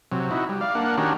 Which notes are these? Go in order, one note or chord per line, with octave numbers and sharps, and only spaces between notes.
C3 F#3
D#4 E4 F#4
G3
D5 F5
A#3 D4 F#5
D#3 C#4 D4 F#4 G4 A#4